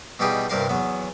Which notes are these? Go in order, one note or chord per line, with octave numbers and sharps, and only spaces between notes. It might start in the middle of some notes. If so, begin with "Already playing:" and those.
B2 E3 G3 D#4 G4 G#4
C2 G2 C3 G3 A#4 F5
E2 F#3 B3